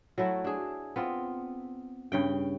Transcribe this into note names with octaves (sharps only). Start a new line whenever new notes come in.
F#3 A3 E4 F#4
D4 G#4
B3 C4 F4
G2 C#3 G5